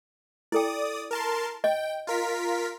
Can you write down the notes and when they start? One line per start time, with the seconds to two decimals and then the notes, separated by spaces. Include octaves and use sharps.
0.52 E4 A4 D5 G5 D#6
1.11 A#4 A5 C6
1.64 D#5 G5
2.07 F4 A#4 B6